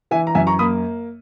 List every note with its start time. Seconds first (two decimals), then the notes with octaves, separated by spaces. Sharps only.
0.11 E3 E5 G#5
0.27 A#5
0.35 F#2 E5 G#5
0.47 A#5 C#6
0.59 A#3 B5 D#6